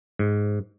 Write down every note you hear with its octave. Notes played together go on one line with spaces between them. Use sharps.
G#2